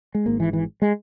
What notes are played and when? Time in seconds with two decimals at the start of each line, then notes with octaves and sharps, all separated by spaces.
0.15 G#3
0.25 G#1 G#2 A#3
0.40 E3
0.53 E3
0.82 G#3